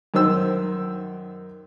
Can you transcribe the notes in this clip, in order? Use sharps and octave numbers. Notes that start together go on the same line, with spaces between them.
F#2 D#3 C5 E6